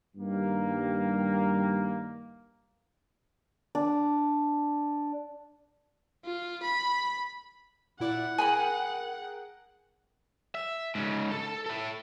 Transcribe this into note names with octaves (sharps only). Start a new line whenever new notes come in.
G2 D#3 G3 A#3
D4
F4
B5
A#2 E4 D5 F#5
G#4 A#4 G5 G#5 B5
E5
G#2 C#3
A4 A5
E4 A4